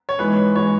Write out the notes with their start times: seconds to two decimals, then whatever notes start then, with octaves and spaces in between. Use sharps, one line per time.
0.09 C#5
0.19 G#2 E3 G#3 B4
0.56 E3 G#3 C#5